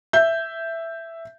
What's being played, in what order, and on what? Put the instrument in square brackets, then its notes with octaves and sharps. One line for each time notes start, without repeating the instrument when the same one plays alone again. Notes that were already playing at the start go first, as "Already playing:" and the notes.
[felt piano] E5 G6